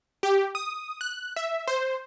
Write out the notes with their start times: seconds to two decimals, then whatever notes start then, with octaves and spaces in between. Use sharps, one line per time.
0.23 G4
0.55 D#6
1.01 F#6
1.36 E5
1.68 C5